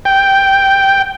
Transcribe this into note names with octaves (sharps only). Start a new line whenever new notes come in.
G5